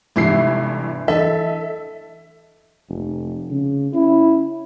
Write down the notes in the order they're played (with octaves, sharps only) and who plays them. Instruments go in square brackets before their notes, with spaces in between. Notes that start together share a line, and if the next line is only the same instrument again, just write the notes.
[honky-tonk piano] G1 E3 C7 [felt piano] G#2 C3 [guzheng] A3 D4 E4
[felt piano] E3 D#5 [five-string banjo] A4 [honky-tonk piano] E5
[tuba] F1
C#3
[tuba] C#4 [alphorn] E4